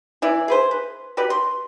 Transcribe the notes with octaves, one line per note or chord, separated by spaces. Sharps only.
E3 E4 D5
G#4 B4 C5
B4
F#4 G4 B4 D5
C6